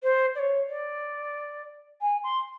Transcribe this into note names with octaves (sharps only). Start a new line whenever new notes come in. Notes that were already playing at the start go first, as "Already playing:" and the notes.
C5
D5
C#5
D5
G#5
C6